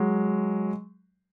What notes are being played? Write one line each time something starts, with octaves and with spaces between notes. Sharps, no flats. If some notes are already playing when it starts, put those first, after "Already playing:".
Already playing: F#3 G#3